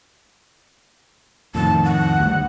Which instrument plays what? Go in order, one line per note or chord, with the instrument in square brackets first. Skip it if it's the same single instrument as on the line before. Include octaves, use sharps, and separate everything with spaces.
[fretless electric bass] F2 A2 D#3 [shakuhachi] A5
[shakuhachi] F#5
[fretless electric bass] D2 G2